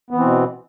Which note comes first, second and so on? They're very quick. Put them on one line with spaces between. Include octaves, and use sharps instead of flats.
B3 E3 C4 B2